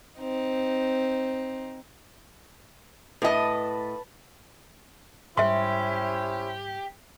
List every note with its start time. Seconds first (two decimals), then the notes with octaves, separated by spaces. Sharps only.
0.19 C4 D#4
3.22 A2 B4 D#5 A5
5.38 G#2 G3 C#4 E4 G4 C5 E5 C6